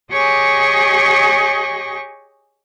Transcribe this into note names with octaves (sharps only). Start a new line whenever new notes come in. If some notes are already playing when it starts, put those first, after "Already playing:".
G4 G#4 C#5 D#5 G#5 C#6